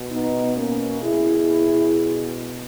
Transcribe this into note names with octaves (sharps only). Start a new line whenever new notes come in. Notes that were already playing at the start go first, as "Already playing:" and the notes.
Already playing: B2
B3 D#4
A#3 C#4
B2 E4 G#4